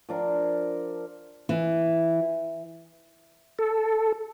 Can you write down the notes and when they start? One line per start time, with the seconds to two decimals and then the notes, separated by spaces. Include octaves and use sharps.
0.09 F3 D4 A#4
1.49 E3
3.59 A4